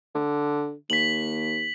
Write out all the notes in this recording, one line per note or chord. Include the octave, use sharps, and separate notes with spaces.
D3
D#2 B6 F#7